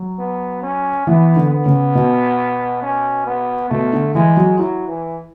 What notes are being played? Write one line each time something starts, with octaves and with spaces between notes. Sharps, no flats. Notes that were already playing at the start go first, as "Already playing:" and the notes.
Already playing: F#3
B3
C#4
E3 B3
D3
B3
C#3
B2
C#4
B3
B2 A3
D3
E3 G#3
F#3
F#3 E4
E3